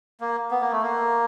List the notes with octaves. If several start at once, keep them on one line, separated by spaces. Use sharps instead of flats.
A#3
B3
A#3
A3
A#3